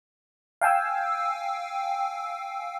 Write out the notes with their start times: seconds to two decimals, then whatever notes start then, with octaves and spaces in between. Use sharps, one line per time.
0.61 F5 G5 G#5 E6